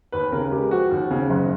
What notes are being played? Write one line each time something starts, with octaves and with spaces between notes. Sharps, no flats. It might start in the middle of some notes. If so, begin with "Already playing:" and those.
D#2 B4
C#3 A#4
G#3 G4
F3 F#4
D#2
C#3
F#1